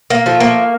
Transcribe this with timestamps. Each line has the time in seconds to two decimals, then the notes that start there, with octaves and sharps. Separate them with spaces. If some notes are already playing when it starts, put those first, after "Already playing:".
0.10 A#3
0.26 F3 A3
0.40 A#3